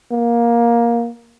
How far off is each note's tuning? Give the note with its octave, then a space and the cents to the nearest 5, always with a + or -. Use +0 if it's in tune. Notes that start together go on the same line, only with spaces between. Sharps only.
A#3 +15